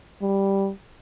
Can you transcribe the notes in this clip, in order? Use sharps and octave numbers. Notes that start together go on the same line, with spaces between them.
G3